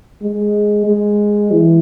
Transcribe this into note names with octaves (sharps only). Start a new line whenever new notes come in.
G#3
G#3
E3